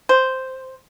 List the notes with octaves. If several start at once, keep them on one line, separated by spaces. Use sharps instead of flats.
C5